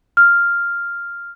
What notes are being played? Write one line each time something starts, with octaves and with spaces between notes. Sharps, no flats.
F6